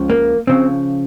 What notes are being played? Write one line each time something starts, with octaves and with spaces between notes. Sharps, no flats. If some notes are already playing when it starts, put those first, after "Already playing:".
Already playing: C#2 C#3 F3
A#3
C#3 F3 C4